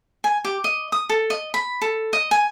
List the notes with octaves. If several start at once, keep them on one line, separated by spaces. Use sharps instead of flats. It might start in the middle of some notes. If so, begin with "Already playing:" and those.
G#5
G4
D#5
D#6
A4
D#5
B5
A4
D#5
G#5